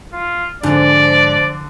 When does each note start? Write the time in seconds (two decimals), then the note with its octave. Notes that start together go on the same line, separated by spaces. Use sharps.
0.13 F4
0.63 G#2 D3 F3 D5